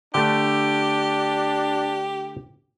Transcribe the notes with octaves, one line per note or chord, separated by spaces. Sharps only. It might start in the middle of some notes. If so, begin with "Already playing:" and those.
D3 A3 D4 G4